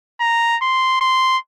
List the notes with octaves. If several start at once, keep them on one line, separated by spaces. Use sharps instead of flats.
A#5
C6
C6